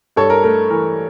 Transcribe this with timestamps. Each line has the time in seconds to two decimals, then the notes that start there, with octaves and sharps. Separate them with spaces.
0.16 G2 A4 C#5
0.30 A#4
0.44 A3 A#4
0.70 E3 A#4